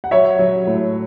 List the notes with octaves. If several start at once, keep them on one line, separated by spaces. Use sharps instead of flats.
F#5
F#3 C#5 E5
F#3
A2